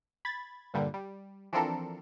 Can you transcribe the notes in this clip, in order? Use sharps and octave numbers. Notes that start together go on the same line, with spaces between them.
B5 G#6 A6
G2 A#2 D3 G3
G3
E3 F3 C4 D4 A4 A#4